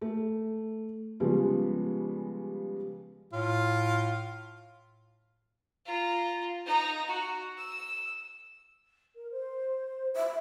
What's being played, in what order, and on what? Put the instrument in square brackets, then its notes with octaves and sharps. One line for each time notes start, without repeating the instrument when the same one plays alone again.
[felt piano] A3
C#3 F3 G3 G#3 B3
[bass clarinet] A2 [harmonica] F4
[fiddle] F4 A#5
D#4 A#5
F#4
E6
[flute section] A#4
C5
[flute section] C5 [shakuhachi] E5